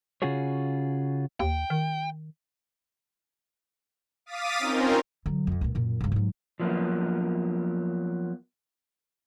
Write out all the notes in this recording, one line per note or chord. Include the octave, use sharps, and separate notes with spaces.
C#3 C#4 F4 F#4 G#4 C#5
D#2 G5
D#3
F5 D6 D#6 A6 B6 D#7
C4 C#4 D#4 F4 A#4
D3 F#3
F2 F3
C#2 A#2
F#2 A#2
G2 C#3
G#2 F#3
F3 F#3 A#3 B3